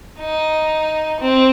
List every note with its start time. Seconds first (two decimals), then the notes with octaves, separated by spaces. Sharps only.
0.20 D#4
1.20 C4